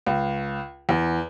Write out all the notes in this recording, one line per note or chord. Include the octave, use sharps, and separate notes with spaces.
C#2
E2